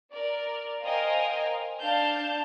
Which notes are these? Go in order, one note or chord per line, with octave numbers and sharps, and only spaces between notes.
A#4 D5
A#4 C5 D#5 F5 G5 G#5
D4 F5 A5 G6